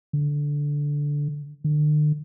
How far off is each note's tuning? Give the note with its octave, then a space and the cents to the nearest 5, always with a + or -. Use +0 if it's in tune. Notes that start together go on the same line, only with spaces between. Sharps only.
D3 -10
D3 +40